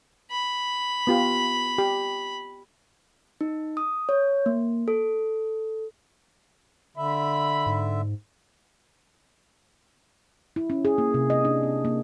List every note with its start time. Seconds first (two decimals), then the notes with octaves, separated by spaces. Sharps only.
0.31 B5
1.07 B3 F4 G4
1.78 G4
3.41 D#4
3.77 D#6
4.09 C#5
4.46 A#3
4.88 A4
6.97 D3 E5 B5
7.66 G#2
10.56 E4
10.70 C#4
10.85 G#4
10.98 A#3
11.14 C3
11.30 D#5
11.45 D4
11.63 C4
11.85 A#3